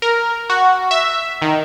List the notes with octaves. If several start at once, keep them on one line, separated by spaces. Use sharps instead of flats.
A#4
F#4
E5
D#3